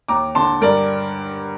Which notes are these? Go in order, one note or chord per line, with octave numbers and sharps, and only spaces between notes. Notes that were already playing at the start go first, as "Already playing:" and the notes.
D#2 A#5 D6
D3 A5 C6
G2 A#4 D5